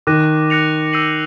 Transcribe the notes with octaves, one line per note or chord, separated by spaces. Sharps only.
D#3 D6 F#6 A#6 D#7
F#6 A#6 C#7 F7
E6 G6 C7 D#7 F#7